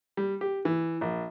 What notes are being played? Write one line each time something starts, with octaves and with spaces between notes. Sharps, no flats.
G3
G4
E3
A#1